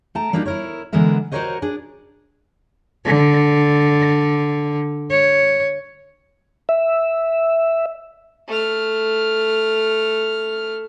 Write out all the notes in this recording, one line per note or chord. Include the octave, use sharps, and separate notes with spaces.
A3 G5 A5 A#5
G3 A#3 D4 D#4 F#4 G4
E4 A#4 C#5
D3 E3 G#3 B3 A#4 E5
F#4 G4 A#4 C5 C#5 D#5
D4 G#4
D3
C#5
E5
A3 F6